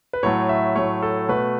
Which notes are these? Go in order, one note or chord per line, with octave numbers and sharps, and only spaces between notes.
B4
A2 F#3 A3 C#5
E5
A2 F#3 A3 C#5
A4
B2 A3 B4